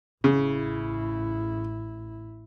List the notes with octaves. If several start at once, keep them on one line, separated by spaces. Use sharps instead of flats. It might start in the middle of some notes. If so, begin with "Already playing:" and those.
A1 C#3 E4